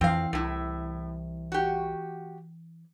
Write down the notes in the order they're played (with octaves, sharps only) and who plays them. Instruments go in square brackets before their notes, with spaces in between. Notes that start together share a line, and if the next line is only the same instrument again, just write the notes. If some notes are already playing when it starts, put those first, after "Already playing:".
[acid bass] F2 [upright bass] E3 [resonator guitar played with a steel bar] C4 F5
[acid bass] C2 [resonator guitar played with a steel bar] A2 E4
[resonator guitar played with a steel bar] F#4 G4